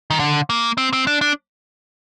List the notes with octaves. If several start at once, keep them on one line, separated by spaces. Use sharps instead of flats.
D#3
D3
A#3
C4
C4
D4
D4